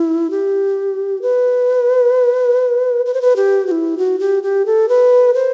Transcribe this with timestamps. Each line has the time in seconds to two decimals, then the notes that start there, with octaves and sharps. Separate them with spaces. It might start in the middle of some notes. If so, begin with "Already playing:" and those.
Already playing: E4
0.31 G4
1.22 B4
3.06 B4
3.14 C5
3.21 B4
3.36 G4
3.67 F#4
3.71 E4
3.98 F#4
4.19 G4
4.43 G4
4.66 A4
4.89 B4
5.34 C5